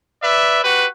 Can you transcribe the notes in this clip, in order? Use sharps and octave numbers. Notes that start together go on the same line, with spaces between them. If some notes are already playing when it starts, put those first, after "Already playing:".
B4 D5 E5
F#4 G4 B4